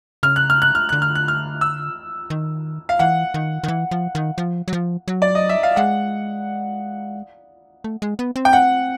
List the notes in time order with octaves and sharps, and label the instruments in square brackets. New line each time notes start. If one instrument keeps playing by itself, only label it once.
[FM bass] C#3 [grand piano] F6
[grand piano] F#6
F6
F#6
F6
[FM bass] D3 [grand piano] F#6
[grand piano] F6
F#6
F6
E6
[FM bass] D#3
[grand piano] F5
[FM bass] E3 [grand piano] F#5
[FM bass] D#3
D#3
E3
F3
D#3
F3
F#3
F3
F#3
[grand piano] D5
D#5
E5
F5
[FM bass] G#3 [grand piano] F#5
[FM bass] A3
G#3
B3
C4
[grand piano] G5
F#5